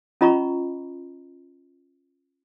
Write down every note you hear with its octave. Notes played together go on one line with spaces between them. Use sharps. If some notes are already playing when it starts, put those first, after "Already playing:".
C#4 F4 D#5 A#5 B5 C#6